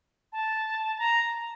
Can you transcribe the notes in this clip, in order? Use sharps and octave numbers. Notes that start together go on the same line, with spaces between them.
A5
A5
A#5